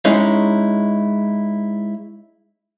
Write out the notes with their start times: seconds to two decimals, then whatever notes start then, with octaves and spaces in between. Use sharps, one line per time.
0.05 G#3 C#4 D#4 E4